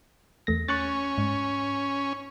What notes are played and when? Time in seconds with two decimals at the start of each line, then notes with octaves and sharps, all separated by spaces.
0.47 E2 A3 A#6
0.68 C#4 C#6 F#6 A6
1.18 G#2